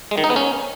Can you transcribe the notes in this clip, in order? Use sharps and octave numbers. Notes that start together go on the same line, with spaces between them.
G#3
D#3
D#4
B3
C#4